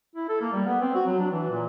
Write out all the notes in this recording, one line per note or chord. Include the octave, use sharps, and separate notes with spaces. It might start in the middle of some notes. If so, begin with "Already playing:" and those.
E4
A4
A#3
G3
B3
C4
F#4
F#3
D4
E3
A#2